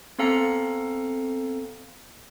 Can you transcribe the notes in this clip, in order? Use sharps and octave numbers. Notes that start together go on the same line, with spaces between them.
B3 C4 A4 F5 A#5 C#7